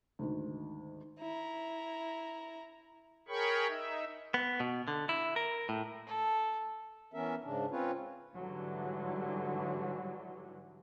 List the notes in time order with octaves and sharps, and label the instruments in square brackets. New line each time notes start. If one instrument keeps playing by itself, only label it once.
[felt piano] D2 G#2 D#3
[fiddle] E4 A#5
[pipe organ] G#4 A#4 C#5 G5 B5 C#6
D#4 E5
[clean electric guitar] B3
B2
D3
E4
A#4
A2
[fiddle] A4
[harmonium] E3 B3 C#4 A#4 E5
G#2 C#3 D4
C4 C#4 F4 B4 C#5
[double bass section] G#2 D3 E3 F#3 G3